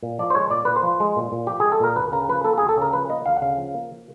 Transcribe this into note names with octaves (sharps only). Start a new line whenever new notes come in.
A#2
F3 D5
C5
G#3 C#5
A#2 D5
A#2 B4
C5
F3
G#3
A#2
A#2
F3 G4
G#3 G#4
A4
A#2 A#4
D2 B4
C#3 A#4
F3 B4
A#3 A4
G#4
D2
A4
C#3 A#4
F3 B4
A#3 D#5
D2 F5
F#5
C#3 F5
F3
A#3